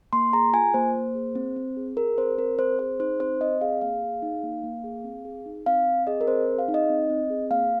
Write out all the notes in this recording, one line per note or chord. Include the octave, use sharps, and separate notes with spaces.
A#3 C6
G#4 A#5
F4 G#5
A#3 C5
A#3
G#4
C4
C4
G#4
G#4 A#4
C4 C5
C4 A#4
C4 C5
G#4 C5
D#4 C5
C4 C5
C4 D#5
G#4 F5
A#3 F5
G#4
D#4
A#3
A#3
G#4
C4
G#4
D#4
C4 F5
C4
G#4 D#5
A#4
C4 C5
G#4
F5
D#4
D#5
C4
C4
G#4
A#3 F5